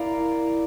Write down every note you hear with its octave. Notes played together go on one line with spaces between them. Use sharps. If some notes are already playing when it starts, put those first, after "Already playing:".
Already playing: E4 A#4 D5 F5